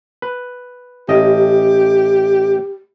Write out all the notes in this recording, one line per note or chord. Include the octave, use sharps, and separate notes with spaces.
B4
A1 G4 D#5